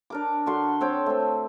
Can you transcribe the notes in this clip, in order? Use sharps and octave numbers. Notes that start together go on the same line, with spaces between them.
D4 A#4 D6
D3 F#4 C6 C#6
C4 C#5 G5 A5
A3 C4